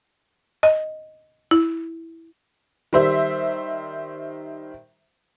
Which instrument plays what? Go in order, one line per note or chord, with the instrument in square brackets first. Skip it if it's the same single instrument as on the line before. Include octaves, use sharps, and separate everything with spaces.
[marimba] D#5
E4
[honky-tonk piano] D#3 G3 C5 E5